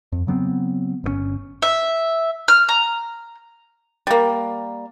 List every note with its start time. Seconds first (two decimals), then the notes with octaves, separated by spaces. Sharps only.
0.12 F2
0.27 C#3 F#3 B3 C4
1.04 G1 C#3 C#4
1.62 E5
2.48 F6
2.69 A#5
4.07 G3 A#3